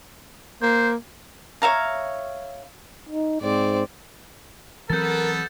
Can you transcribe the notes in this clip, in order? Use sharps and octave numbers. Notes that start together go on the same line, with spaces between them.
A#3 C5
C#5 E5 F5 A#5
D#4
G#2 C4 D5
E3 F#3 B3 C4 A4 A#4 G6 A6